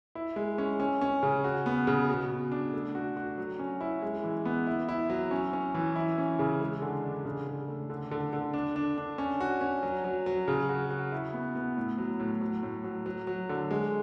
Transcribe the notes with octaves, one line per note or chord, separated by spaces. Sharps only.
E4
G#3
C#4
C#4
C#4
C#3
F#4
B3
C#3
B2
B2
D4
A3
F#4
F#4
F#3
C#4
E4
G#3
E3
B3
E4
E4
F#3
C#4
C#4
E3
E4
C#4
C#3
G#3
D3
D4
C#3
C#3
A3
D3
D3
D3
D4
D4
D4
C#4
F#4
C#4
F#3
F#3
F#3
C#3
F#4
F#4
E4
B3
B3
A2
F#3
A2
F#3
A2
F#3
F#3
F#3
D3
G#3